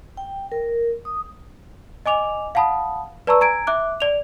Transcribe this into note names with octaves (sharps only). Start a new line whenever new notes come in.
G5
A#4
D#6
D#5 G#5 D6 F7
F5 F#5 A5 B5 D#6
B4 D5 A5 A#5 C#6 E6
G#5 A#5 G#6 D7
E5 D6 F#6
D5 F7